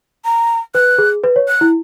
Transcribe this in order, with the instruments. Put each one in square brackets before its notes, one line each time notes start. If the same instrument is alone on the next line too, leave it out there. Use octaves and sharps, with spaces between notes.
[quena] A#5
[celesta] B4 [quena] F#6
[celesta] G#4
B4
C#5
[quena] F#6
[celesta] E4